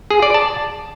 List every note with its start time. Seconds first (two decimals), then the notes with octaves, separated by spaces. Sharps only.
0.11 G#4
0.22 D5
0.34 A5